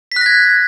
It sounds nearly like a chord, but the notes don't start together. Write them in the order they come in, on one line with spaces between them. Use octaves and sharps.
B6 F#6 A#6 G#6